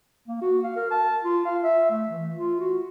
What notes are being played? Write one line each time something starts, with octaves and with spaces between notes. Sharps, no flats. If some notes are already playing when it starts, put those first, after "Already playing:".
A#3
F#4
F5
A#4
A5
F4
F5
E5
A3
E3
F4
F#4